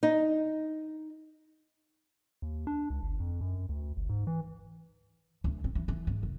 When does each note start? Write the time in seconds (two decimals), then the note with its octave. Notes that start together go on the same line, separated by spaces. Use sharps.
0.03 D#4
2.42 D#2
2.67 D4
2.90 C#2
3.03 G1
3.20 F2
3.41 F#2
3.69 D2
3.97 G1
4.09 G#2
4.27 E3
5.44 D2
5.64 C4
5.75 E3
5.88 E3
6.07 G#2
6.23 F1